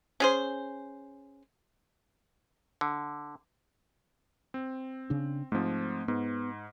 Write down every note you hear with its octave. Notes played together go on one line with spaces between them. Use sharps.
C#4 G#4 C5
D3
C4
C#3 D4
G#2 F3 A3 C4
G#2 B3